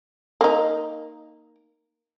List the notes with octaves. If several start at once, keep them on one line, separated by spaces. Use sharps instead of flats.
A#3 D#4